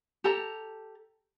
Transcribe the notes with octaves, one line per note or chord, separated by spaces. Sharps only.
G4 A4 A5 A#5